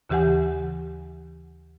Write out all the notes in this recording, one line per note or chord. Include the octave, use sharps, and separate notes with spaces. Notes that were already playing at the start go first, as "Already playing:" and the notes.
D#2 C#3 E3 G4 F#5 G#5